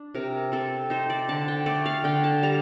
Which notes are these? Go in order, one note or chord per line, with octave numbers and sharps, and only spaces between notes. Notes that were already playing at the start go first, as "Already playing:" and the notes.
Already playing: D4
C3 A#4
C4 A4
D#4 C5
D5
D3 A5
G5
A3 D5
F5
D3 G5
A5
G3 A#5